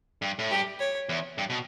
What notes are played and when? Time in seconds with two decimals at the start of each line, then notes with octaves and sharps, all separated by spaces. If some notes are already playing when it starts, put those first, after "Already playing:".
0.22 G2
0.39 A2
0.51 G2 G4
0.79 C#5
1.09 E2
1.38 G2
1.50 B2